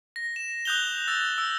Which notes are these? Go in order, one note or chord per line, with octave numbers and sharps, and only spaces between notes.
A#6
E7
D#6 F#6 G6 F7 G7
E6 A6
E6